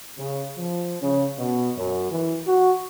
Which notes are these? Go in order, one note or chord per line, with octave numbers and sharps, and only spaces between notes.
C#3
F3
C#3
B2
F#2
E3
F#4